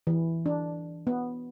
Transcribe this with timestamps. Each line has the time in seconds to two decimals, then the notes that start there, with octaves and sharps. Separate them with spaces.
0.07 E3
0.46 D4
1.07 B3